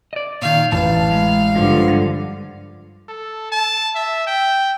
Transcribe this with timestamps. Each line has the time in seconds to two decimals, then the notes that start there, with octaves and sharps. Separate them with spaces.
0.13 D5 D#5
0.42 A#2 D#3 F5
0.72 A1 F5 A5
1.11 G#3
1.56 G2 D3 F3
3.09 A4
3.52 A5
3.95 E5
4.27 G5